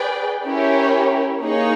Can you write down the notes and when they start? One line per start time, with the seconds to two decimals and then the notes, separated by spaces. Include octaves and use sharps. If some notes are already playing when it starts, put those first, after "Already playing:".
Already playing: G#4 B4 D5 G5
0.45 C#4 E4 G4 A#4 C#5
1.41 A#3 D#4 G#4 C#5